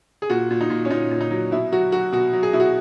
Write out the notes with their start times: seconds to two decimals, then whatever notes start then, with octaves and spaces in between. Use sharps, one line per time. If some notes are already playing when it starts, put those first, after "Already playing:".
0.22 G#4
0.30 A#2 F#4
0.50 A#2
0.61 D#4
0.70 A#2
0.85 C#4
0.90 A#2 D#4
1.11 A#2
1.21 D#4
1.31 F#3
1.51 B2 E4
1.72 F#3 F#4
1.92 F#3 F#4
2.12 B2 F#4
2.33 F#3
2.43 G#4
2.53 B2 E4
2.60 F#4